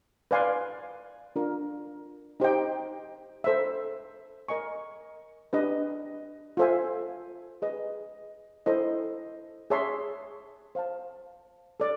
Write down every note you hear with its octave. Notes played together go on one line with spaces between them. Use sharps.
B4 D5 F5 G#5 C6
D4 F4 A#4
D#4 G4 C5 D#5 G5
A4 C5 E5
A#4 D#5 G#5 C#6
D4 G4 B4 D#5
F4 A4 C5 E5 G#5
G#4 B4 D#5
E4 A4 C5 D#5
G#4 C#5 E5 A5 C6
C5 F5 A5
A4 D5